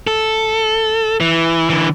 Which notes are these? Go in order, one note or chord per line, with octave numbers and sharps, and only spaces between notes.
A4
E3
D3 E3